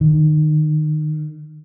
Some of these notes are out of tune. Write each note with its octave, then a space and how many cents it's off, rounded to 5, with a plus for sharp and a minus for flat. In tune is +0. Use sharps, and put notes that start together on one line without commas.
D#3 -25